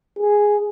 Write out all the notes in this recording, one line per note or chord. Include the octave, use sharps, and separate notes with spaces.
G#4